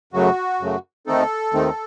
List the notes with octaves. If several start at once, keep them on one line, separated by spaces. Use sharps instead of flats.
F#2 C#3 F#3 A3 F#4
F#2 C#3 F#3 A3
D#2 D#3 A3 C4 D#4 A4
D#2 D#3 A3 C4 D#4